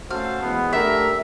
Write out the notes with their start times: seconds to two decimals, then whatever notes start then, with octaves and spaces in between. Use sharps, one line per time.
0.10 A3 C#4 F#4 A4 C5 F5
0.42 E3 G#3 B3
0.73 A3 D4 G4 A#4 E5